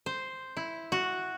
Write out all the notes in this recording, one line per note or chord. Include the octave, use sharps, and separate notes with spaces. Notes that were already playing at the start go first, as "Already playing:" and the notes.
C5
E4
F#4